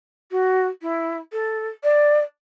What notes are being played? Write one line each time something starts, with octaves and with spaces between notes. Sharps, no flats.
F#4
E4
A4
D5